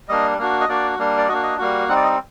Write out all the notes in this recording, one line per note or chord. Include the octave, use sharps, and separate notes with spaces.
G3 A#3 D4 D#5
A#3 D4 F#4
D#5
A#3 D4 F#4 D5
G3 A#3 D4
D5
A#3 D4 F#4 D#5
D#5
G3 A#3 F#4
G3 C4 D#4 F#5
D5
D#5